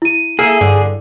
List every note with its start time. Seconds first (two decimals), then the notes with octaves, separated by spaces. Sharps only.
0.02 E4 D#7
0.39 A#3 G#4 A4 E5
0.61 G2 D3